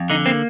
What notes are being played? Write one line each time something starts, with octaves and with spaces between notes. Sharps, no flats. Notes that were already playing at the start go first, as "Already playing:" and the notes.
Already playing: F2
D3 D#4
A#3 C4